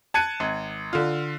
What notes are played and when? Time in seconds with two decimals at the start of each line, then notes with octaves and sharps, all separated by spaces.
0.14 A5 F#6 G#6 C#7 D#7
0.40 G#1
0.93 D3 F4